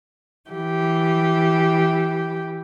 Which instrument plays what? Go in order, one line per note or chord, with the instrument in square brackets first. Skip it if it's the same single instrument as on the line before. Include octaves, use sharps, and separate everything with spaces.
[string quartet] E3 G4